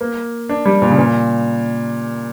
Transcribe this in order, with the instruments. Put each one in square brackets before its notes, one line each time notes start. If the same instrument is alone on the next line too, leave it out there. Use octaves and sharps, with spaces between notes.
[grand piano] A#3
D4
G3
A#2
C#3
A#2